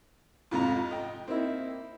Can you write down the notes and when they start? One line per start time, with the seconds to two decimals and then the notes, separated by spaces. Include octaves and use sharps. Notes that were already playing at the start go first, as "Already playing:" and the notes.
0.51 F2 G#2 C3 F4 A#5
0.91 D#5 G5
1.28 A#3 C4 D#4 E4